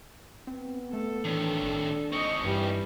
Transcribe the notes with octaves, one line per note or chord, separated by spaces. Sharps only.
B3 C4
A3 A4
A2 D#3 E3 D4
G#1
C4 D#4 D#5 C#6
G2 E3 G3